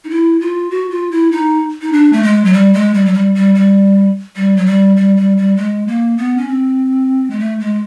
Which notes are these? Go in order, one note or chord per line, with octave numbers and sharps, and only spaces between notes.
D#4
E4
F4
F#4
F4
E4
D#4
D#4
D4
A3
G#3
F#3
G3
G#3
G3
F#3
G3
G3
G3
G3
F#3
G3
G3
G3
G3
G#3
A#3
B3
C#4
C4
G#3
A3
G#3